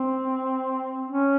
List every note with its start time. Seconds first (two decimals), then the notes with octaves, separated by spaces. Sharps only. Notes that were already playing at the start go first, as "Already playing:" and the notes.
Already playing: C4
1.08 C#4